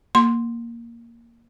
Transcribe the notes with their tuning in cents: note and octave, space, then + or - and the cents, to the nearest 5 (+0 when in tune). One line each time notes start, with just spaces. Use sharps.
A#3 +0 C6 +0